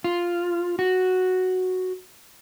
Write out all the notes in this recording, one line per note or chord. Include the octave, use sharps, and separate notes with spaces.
F4
F#4